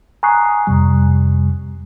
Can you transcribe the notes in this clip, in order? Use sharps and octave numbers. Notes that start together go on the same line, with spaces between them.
G#5 A#5 C#6 D#6 F#6 C7
F2 C3 G3